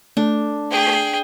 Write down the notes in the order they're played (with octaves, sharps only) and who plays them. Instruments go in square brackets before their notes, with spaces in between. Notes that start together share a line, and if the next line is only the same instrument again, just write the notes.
[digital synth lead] A3 [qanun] D4
[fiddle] G#4 G5